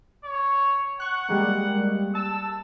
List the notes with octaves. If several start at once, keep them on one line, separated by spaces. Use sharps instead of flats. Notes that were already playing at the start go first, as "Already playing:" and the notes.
C#5
F#5 C#6 F#6
G3 G#3 A#3
A5 E6